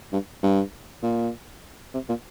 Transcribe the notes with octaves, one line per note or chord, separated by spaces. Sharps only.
G2
G2
A#2
C3
A#2